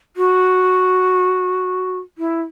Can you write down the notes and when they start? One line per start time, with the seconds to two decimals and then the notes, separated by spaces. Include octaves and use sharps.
0.17 F#4
2.18 E4